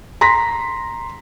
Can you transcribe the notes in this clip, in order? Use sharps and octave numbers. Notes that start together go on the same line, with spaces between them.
A#5 C6 A#6 B6